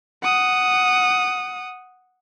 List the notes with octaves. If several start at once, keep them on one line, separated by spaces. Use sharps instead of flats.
F#5 D#6